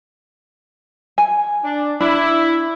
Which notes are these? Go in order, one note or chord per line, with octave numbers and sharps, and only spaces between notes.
G#5
D4
D4 E4